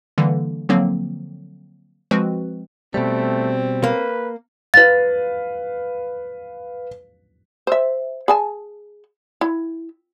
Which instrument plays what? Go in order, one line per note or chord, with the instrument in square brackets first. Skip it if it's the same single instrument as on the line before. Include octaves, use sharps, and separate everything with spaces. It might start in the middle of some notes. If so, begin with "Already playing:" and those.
[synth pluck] D3 E3 G3 A#3
D3 F3 F#3 A#3 C4
F3 G#3 C4 F#4 B4
[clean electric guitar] B2 G3 [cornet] A3 [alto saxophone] C4
[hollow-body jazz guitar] A#3 [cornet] B4
[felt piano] B4 F5 [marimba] A6
[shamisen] C5 E5
G#4 G#5 A5
E4